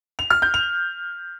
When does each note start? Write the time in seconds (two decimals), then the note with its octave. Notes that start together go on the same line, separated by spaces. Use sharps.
0.19 F7
0.30 F6
0.42 G6
0.54 F7